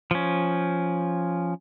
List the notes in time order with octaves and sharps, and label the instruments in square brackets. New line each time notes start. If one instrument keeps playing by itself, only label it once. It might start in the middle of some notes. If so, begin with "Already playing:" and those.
[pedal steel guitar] F3 C#4